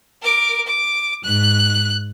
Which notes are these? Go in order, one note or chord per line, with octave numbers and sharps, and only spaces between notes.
A#4 D6
D6
G#2 F#6